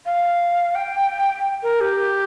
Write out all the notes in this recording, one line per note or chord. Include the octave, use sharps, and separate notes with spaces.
F5
G5
A#4
G4